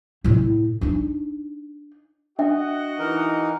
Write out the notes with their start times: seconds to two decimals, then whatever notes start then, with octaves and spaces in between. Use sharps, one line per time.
0.24 A2 E4
0.81 D4 D#4
2.39 D4 F#4 D#5 E5 F#5 G5
2.99 E3 D#4 A#4